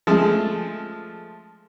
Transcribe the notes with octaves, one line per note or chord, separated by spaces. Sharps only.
F3 G#3 A3